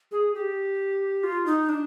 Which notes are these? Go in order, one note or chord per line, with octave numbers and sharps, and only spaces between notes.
G#4
G4
F4
D#4
D4